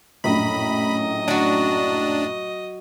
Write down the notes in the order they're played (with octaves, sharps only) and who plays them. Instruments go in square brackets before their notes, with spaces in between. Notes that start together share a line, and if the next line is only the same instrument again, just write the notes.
[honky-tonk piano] A#1 F#2 A2 [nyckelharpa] D#5 [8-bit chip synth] B5
[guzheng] F#3 F#4 [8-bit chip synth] D4